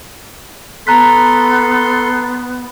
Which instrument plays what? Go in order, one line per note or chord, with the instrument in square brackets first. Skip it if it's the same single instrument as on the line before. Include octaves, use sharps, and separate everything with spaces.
[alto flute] B3 [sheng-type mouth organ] A4 C6 [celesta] A#5 F#6 B6